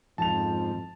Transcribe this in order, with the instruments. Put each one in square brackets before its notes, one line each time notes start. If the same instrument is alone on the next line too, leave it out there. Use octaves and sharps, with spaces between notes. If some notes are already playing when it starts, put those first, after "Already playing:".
[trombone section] F2 [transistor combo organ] G#2 F3 [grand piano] A5 F7